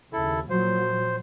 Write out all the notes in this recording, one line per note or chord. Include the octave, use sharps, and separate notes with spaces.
D#2 C#3 E4 A4
A#2 F3 F#3 C5